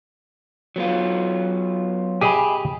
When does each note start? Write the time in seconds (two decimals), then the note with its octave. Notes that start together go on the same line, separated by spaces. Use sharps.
0.76 F#3 B3 F4
2.21 G4 G#4 D#5 G#5 B5